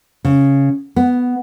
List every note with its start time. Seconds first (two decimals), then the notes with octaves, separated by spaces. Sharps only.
0.25 C#3
0.96 B3